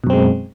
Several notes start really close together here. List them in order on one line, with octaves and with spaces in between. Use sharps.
B2 F#2 C4 G#3